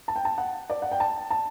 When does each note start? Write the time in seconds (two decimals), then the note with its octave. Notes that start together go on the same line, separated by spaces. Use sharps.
0.08 A5
0.16 G5
0.25 A5
0.38 F#5
0.70 D5
0.82 F#5
0.92 G5
1.00 A5
1.30 A5